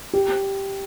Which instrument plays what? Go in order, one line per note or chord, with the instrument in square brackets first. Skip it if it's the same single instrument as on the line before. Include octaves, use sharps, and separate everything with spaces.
[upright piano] G4